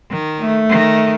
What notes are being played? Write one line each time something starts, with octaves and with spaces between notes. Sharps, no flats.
D#3
A3
D#3